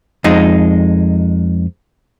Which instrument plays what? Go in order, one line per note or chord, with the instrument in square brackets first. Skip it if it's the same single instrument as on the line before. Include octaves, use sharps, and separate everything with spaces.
[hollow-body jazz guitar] F2 G#3 D#4